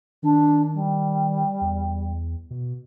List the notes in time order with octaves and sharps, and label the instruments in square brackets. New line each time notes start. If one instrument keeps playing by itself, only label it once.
[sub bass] D#3 [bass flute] D4
[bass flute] G3
[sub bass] E2
B2